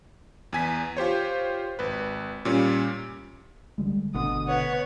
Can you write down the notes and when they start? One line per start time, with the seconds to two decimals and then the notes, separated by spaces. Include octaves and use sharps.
0.53 E2 G#5 B6
0.97 F4 G4 C5 C#5
1.79 G#1 B4
2.45 A#2 G3 C#4
3.78 D3 G3 G#3
4.14 G#1 D2 B2 D3 D#6
4.47 B3 C#5 F#5